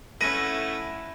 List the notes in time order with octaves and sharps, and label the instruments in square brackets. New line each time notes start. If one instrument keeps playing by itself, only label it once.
[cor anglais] A3 [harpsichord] C#4 B4 [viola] E4 F#5 [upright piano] A#6 D#7